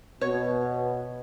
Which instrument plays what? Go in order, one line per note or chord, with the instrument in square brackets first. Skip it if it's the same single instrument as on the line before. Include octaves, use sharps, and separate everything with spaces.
[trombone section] B2 [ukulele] C#5